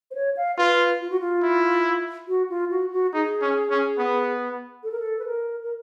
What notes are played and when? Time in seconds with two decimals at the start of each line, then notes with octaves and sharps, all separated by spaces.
0.11 C5
0.15 C#5
0.37 F5
0.58 F4 B4
1.01 F4
1.10 F#4
1.20 F4
1.43 E4
2.28 F#4
2.50 F4
2.70 F#4
2.92 F#4
3.13 D#4 G#4
3.42 C#4
3.70 C#4
3.99 B3
4.83 A4
4.92 A#4
4.99 A4
5.19 B4
5.26 A#4
5.63 A#4